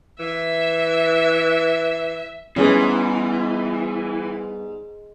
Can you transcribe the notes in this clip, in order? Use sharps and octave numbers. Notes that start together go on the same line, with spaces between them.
E3 E5
G#2 E3 G3 B3 C#4 G#4 B4